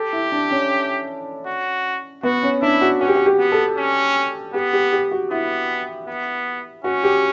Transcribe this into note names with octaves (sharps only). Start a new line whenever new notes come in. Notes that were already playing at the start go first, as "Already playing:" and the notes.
Already playing: G4 A4
E4
D4
C#4
F#4
B3 F#4
C#4
D4 E4
F#4
C#4 F#4
G4
F#4
G4
B3
A4
C#4
B3 G4
G4
G4
F#4
B3 E4
B3
C#4 F#4
G4